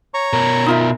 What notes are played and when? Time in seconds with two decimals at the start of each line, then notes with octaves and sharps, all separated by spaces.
0.14 C#5 A#5 C#6
0.33 B2 A#4
0.66 D#4 F4 E5